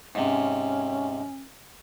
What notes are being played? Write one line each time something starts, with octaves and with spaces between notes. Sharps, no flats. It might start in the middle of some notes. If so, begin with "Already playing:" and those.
G#2 C3 C#4